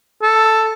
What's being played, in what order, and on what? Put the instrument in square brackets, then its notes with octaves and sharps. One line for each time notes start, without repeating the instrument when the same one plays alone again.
[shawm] A4